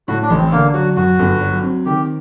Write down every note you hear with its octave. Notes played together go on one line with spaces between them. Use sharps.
A2 F#4
D4
A1
C4
D3 A#3
F#3 F#4
F#2 F#4
G1
F#3
C4
D#3 G4